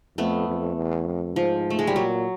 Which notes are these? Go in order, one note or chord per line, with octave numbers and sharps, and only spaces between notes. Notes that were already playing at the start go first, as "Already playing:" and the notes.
F2 A3 B3
F2
E2
F2
G#2 F3
A3
G#3
G3
A#2 F#3